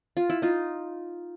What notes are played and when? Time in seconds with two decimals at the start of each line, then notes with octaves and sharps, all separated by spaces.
0.17 F4
0.30 E4
0.42 D#4 F4